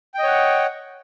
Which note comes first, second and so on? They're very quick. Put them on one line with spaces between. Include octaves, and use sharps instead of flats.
G5 D#5 C#5 F#5